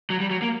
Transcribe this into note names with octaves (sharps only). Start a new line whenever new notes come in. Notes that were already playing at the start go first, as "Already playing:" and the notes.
F#3
G3
F#3
A#3